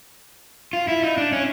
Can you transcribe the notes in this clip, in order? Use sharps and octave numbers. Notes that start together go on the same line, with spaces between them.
F4
E4
D#4
D4
C#4